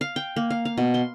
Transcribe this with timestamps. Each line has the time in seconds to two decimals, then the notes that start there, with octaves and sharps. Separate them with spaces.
0.01 F5
0.16 G5
0.36 A#3
0.50 F5
0.65 F5
0.78 B2
0.94 C6